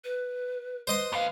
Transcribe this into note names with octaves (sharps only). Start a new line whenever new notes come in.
B4
B4 C5 D#5 C6
D#2 B4 F5